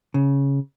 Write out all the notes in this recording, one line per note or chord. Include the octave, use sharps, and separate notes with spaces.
C#3